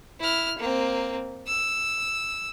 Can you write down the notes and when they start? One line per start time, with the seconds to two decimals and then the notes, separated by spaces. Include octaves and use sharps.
0.20 E4 F6
0.59 A#3 C4
1.47 E6